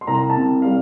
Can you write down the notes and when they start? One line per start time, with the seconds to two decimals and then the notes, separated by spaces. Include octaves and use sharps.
0.01 C6
0.07 C2 A#5
0.30 A5
0.37 C3
0.62 G3 F5